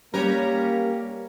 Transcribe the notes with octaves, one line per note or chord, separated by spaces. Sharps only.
G3 A#3 C#4 G4 A#4 B4 C#5